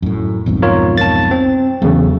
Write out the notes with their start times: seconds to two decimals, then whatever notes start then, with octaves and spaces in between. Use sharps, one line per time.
0.02 F#2 A2
0.46 B1 F2 G#2
0.62 F4 A#4 C#5
0.98 A5 A6
1.31 C4
1.82 E2 C#3 F#3 A3